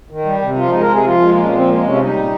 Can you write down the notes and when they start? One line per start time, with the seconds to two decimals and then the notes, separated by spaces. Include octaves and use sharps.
0.10 D#3
0.25 G3
0.42 C3
0.57 F3 F4
0.70 G#3 D#4
0.80 A#4
0.89 C3 G#4
1.05 F3 F4
1.20 G#3
1.29 A#3
1.36 A#2
1.44 C#4
1.52 F3 C4
1.67 G#3 A#3
1.84 C3 C#4
1.95 F4
1.99 G3 D#4
2.16 A#2